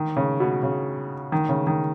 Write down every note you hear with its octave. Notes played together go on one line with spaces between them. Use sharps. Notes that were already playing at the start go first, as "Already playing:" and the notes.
Already playing: D#3
C#3
B2
C#3
D#3
C#3
D#3